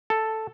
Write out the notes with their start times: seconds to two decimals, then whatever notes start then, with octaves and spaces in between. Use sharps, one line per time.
0.10 A4